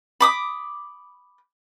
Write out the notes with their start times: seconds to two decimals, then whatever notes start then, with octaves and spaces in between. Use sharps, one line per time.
0.20 B5 D6 D#6